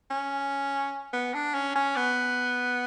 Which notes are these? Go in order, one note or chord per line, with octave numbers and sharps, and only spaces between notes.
C#4
B3
D4
C#4
C#4
B3